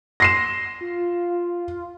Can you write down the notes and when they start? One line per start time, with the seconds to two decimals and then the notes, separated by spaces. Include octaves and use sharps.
0.20 C6 A#6 C7 E7
0.81 F4